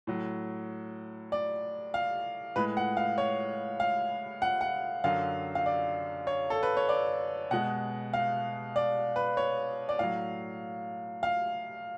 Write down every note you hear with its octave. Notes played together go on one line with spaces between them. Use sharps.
A2 F#3
D5
F5
A2 G#3 B4
F#5
F5
C#5
F5
F#5
F#5
F#2 D3 F#3 F5
F5
D5
C#5
A4
B4
C#5
D5
B2 G#3 F#5
F5
D5
B4
C#5
D5
A2 F#3 F5
F5